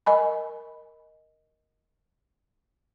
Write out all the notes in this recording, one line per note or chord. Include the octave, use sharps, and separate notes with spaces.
A#4 D#5 G#5 B5